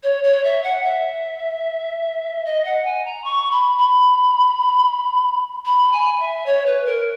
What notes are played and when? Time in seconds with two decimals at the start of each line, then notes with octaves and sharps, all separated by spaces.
0.03 C#5
0.23 C#5
0.43 E5
0.63 F#5
0.83 E5
2.45 D#5
2.64 F#5
2.84 G#5
3.05 A#5
3.24 C#6
3.51 B5
3.78 B5
5.65 B5
5.92 G#5
6.19 E5
6.46 C#5
6.66 B4
6.85 A#4